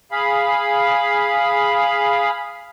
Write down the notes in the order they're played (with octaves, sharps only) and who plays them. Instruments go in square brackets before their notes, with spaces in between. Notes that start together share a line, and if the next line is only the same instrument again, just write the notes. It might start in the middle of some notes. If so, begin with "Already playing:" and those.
[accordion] G#4 F5 B5